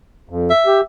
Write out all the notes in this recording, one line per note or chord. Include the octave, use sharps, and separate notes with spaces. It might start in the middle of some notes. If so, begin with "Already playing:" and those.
F2
E5
G4